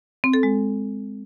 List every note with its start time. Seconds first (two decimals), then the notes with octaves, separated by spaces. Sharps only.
0.24 C4
0.33 A4
0.43 G#3